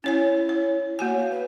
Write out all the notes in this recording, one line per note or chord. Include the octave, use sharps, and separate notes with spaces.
C#4 E4 C#5 G#5
C#5
A#3 F#4 C#5 G#5
F5
B4